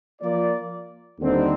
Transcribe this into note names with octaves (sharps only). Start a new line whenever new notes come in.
F3 A#3 F4 A#4 D5
D#2 D3 G3 C4 D#4